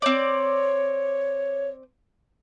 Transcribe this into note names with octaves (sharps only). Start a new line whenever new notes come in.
C4 C#5 D5